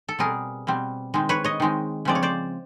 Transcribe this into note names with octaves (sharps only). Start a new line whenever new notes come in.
A4
B2 G3 C4 G#4 A#4
B2 G3 C4
D#3 G#3 C4
B4 C#5
C#5 D#5
D#3 G#3 C4
C#3 F3 G#3 C4 D5
C#5
C5 D5